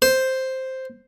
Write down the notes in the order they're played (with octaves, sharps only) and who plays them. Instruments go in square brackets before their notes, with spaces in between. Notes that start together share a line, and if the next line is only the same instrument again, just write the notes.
[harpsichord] C5